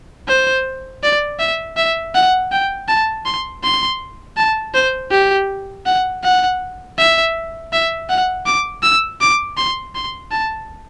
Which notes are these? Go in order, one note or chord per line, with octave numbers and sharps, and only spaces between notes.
C5
D5
E5
E5
F#5
G5
A5
C6
C6
A5
C5
G4
F#5
F#5
E5
E5
F#5
D6
E6
D6
C6
C6
A5